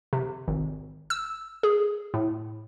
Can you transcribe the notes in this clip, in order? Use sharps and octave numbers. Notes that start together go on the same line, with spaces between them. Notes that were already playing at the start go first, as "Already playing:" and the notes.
C3
G#1
E6
G#4
A2